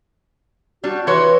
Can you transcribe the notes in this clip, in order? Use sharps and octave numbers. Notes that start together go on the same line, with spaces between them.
G3 D4 F#4
E3 F#4 C#5 C6